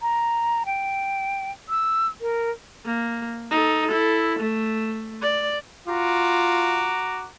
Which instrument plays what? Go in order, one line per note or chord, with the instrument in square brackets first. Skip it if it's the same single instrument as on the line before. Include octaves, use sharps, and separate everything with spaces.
[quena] A#5
G5
E6
A#4
[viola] A#3
D#4 A4
E4 A4
A3
D5
[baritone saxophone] F4 [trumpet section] F#4 A#5 D6